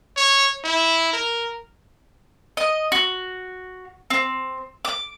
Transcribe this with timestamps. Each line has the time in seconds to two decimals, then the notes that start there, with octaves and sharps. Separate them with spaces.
0.16 C#5
0.64 E4
1.13 A#4
2.57 D#5
2.92 F#4
4.10 C4
4.85 D6